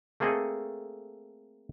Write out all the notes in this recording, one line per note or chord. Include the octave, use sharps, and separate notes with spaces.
A3 A#3 C4 G#4 A4 D#5